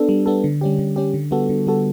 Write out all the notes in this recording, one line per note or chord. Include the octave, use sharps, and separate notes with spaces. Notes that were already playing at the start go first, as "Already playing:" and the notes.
Already playing: B3 D4 A4
G3
B3 D4 A4
D3
G3 C#4 G4
D3
G3 C#4 G4
D3
G3 B3 F#4 A4
D3
G3 B3 F#4 A4